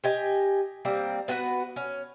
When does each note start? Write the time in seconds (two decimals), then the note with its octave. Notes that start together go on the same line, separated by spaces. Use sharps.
0.04 G4 D#5 G#5
0.85 G3 A#3 C4
1.28 B3 F#4 B4 F#5
1.76 C#4